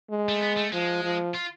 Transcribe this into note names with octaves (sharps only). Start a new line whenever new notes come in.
G#3
A3
B3
A3
F3 G#3
F3
F4